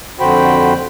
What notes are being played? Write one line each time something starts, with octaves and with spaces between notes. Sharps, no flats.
F2 D3 F#4 C5 G5 B5